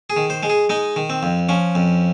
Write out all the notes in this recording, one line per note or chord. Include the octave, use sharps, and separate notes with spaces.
G#4
D#3
C5
G#3
G#4
G#3 D#4
D#3
C4
F2
F3 C#4
F2